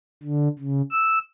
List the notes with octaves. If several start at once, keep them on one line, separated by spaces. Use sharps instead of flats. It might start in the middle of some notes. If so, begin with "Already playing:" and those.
D3
C#3
E6